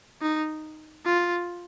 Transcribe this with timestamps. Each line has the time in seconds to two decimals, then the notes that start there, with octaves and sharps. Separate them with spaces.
0.21 D#4
1.05 F4